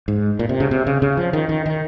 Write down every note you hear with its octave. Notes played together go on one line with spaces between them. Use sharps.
G#2
A#2
C3
C#3
C3
C#3
C#3
F3
D#3
D#3
D#3